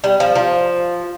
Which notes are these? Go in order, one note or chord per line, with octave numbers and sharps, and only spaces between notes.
G3
F3
F3